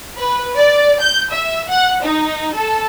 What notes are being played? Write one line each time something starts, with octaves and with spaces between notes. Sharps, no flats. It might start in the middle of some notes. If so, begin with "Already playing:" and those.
B4
D5
G6
E5
F#5
D#4
A4